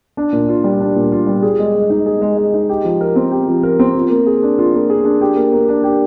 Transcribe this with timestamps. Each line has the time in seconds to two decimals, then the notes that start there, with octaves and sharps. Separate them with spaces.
0.17 D4
0.33 A#2
0.49 F4
0.64 G3
0.80 D4
0.96 A#2
1.12 F4
1.27 G3
1.43 G#4
1.59 G#3
1.74 G#3
1.90 D#4
2.06 G#4
2.22 G#3
2.37 G#3
2.53 D#4
2.69 G4
2.85 F3
3.01 A#4
3.16 C4
3.31 G4
3.48 F3
3.63 A#4
3.79 C4
3.95 F4
4.10 A#3
4.26 G#4
4.42 D4
4.59 F4
4.74 A#3
4.90 G#4
5.05 D4
5.21 G4
5.36 A#3
5.52 A#3
5.68 D4
5.84 G4